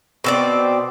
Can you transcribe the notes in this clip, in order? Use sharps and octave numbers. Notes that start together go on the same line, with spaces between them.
B2 C4 D5